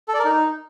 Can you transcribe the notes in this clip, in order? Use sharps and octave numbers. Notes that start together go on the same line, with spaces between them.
A4
D5
A#4
D#4